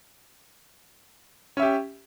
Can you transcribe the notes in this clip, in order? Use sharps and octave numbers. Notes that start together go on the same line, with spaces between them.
C#4 G4 E5